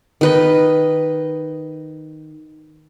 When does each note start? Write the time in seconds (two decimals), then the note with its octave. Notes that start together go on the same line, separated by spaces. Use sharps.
0.21 D#3 B4 D#5